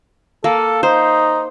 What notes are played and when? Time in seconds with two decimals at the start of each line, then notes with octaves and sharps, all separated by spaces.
0.44 A#3 A4
0.83 D#4 C5